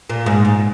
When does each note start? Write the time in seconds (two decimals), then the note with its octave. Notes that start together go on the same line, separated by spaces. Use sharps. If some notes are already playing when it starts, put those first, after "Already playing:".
0.09 A#2
0.26 G#2
0.45 G#2